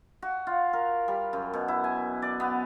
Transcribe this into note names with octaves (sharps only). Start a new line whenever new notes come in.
F#4
F4
A#4
G3
F#2
B2
E4
G#5
D5
B3